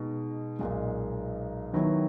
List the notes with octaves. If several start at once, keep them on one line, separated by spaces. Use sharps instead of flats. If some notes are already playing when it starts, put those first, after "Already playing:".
Already playing: B2 G#3 D#4
B1 A#2 G#3
D#2 D#3 F#3 B3 E4